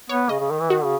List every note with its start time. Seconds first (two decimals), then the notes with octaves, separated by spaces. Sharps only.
0.09 B3 C#5
0.29 C#3 D#5
0.39 C#3
0.50 D#3
0.61 E3
0.70 D#3 F#4
0.84 C#3